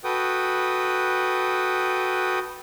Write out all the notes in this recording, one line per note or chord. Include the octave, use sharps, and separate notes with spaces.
F#4 A4 B4 G5 D#6